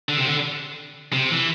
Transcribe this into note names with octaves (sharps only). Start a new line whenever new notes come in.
D3
C3
D3
C3
E3